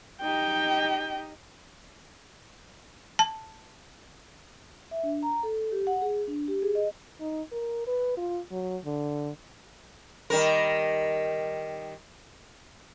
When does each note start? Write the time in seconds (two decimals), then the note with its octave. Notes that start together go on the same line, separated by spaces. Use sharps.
0.21 D#4 G4 D#5 G5
3.19 A5
4.91 E5
5.03 D4
5.23 A#5
5.43 A4
5.72 G4
5.87 F#5
6.02 G#4
6.27 D4
6.48 G4
6.62 G#4
6.75 D#5
7.21 D#4
7.52 A#4
7.87 B4
8.17 F4
8.51 F#3
8.85 D3
10.30 D#3 G3 A#4